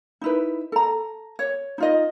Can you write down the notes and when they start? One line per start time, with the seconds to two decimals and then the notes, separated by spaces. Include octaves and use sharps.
0.21 D#4 E4 B4
0.72 A4 A#5
1.39 C#5
1.78 D#4 F4 D#5